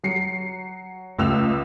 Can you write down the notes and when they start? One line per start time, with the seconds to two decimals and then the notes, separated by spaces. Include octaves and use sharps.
0.03 F#3 C7 C#7
1.19 C#2 A3 E6 F7